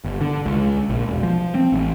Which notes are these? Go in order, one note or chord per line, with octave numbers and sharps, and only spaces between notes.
G1
D3
C#2
A#1
E1
F3
C4
A1